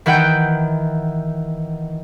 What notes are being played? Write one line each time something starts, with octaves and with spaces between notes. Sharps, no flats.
D#3 E3 B4 F#5 G5 G6